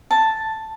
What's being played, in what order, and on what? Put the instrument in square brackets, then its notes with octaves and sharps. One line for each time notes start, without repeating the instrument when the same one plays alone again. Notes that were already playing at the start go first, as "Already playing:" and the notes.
[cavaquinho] A5